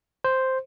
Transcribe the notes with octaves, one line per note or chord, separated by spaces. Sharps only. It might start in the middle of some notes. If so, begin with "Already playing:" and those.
C5